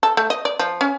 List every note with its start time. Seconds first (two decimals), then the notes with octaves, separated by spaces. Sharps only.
0.03 A4
0.17 A3
0.30 D#5
0.45 D5
0.59 F3
0.81 C#4